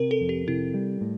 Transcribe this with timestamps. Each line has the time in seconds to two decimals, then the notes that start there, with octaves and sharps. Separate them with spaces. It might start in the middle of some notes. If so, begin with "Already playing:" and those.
Already playing: C3 A#4
0.11 A4
0.21 F2
0.29 G4
0.48 C3 E4
0.74 G3
1.01 A2